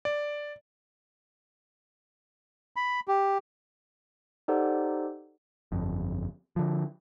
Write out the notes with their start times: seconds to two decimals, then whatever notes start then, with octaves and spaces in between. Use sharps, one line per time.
0.05 D5
2.76 B5
3.08 G4
4.48 D#4 G4 A4 C5 D5 F#5
5.72 G1 F2
6.56 D3 F3